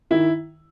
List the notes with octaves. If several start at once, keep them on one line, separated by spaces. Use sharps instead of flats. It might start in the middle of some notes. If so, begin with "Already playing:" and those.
D#3 E4